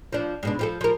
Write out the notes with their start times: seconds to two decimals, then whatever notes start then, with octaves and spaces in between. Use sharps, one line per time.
0.12 F3 D4
0.43 G#2 B2 D4
0.59 F3 G4 A4
0.81 F3 A#4